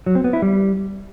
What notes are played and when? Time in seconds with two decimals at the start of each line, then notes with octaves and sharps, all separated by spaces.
0.06 F#3
0.15 C4
0.24 B3
0.33 E4
0.42 G3